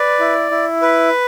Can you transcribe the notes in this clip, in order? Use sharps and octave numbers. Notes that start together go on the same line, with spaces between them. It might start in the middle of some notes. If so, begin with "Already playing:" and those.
Already playing: B4 D5
E4
E4
B4